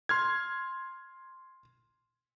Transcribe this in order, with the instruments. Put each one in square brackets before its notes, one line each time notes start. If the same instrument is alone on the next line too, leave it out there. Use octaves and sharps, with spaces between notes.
[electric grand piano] C6 F6 G#6